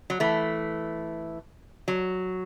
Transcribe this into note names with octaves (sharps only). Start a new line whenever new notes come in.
F#3
E3 A3
F#3